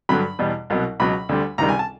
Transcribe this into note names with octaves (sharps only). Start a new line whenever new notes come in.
G2 D3 F#3 B5
E2 B2 G3
C2 B2 F#3
C#2 B2 F#3 B5
D2 D3 G3
C#2 C3 D#3 G3 A#5
G#5
A5